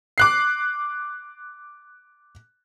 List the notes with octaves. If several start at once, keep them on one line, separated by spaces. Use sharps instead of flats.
D6 F#6 C7